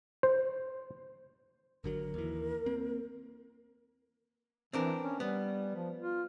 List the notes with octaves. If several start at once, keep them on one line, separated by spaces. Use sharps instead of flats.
C5
G#1 D3 F#3 A#4
D#2 E3
A#3 C4
E3 C4 D4 A#4
C#4
G3 B3
F3
F4